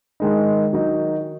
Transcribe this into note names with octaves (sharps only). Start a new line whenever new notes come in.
D#3 G#3 D#4
D#3 F#3 D#4